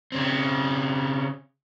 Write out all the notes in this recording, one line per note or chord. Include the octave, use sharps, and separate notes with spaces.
C#3 C4